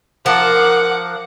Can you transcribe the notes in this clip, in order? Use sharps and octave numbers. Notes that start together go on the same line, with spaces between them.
F3 A#4 F#5 A5 D6